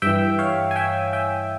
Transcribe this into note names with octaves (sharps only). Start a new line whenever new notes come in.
G2 E3 E5 G5
C#5 F5
G#5
E5 G5
E5 G5